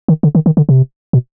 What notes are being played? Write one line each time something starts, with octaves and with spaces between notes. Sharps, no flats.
D#3
D3
D#3
D#3
D3
C3
B2